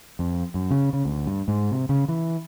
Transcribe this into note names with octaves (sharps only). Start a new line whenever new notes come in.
F2
F#2
C#3
C#3
D2
G2
G#2
C3
C#3
E3